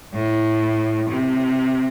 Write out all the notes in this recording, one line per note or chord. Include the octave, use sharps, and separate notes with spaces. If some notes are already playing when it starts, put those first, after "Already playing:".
A2
C3